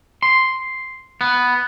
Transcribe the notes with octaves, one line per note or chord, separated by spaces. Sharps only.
C6
B3